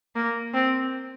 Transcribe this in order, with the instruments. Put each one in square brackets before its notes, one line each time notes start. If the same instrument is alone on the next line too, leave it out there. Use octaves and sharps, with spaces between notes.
[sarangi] A#3
C4